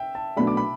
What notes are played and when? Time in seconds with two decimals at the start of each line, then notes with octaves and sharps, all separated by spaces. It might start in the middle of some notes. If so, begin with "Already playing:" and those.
Already playing: E5 G5
0.15 A5
0.36 B1 B2 A3 D4 B5
0.47 D6
0.57 B5